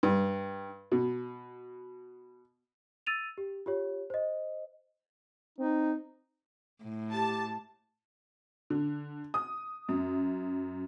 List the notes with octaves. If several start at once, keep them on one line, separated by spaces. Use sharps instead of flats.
G2
B2
E6 A6 D#7 F7
G4
F4 G4 C#5
C5 D#5
C4 D#4
A2
G4 A5
D3
D#6
F#2